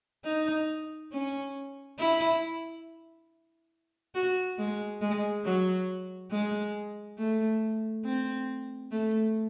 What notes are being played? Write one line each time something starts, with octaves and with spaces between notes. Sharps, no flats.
D#4
C#4
E4
F#4
G#3
G#3
F#3
G#3
A3
C4
A3